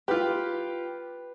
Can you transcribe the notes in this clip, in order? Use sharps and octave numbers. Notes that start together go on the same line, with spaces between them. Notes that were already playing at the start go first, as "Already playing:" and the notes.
F4 G4 B4